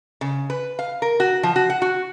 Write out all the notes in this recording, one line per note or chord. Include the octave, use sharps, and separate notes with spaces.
C#3
B4
F5
A#4
F#4
F3
F#4
F#5
F#4